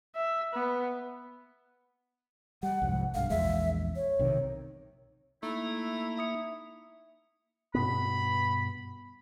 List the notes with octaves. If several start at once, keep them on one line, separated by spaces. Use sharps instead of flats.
E5
B3
G3 F#5
C2 F2 G#2
B1 G2 F5
A#1 E2 G#3 E5
C#5
B1 C3 D#3
A3 A#3 D#4 E4 A#5
E5 D#6 C#7
G2 B2 B3 B5